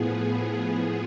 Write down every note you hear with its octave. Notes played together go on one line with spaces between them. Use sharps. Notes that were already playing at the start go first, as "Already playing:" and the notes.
Already playing: A2 F3 B3 G#4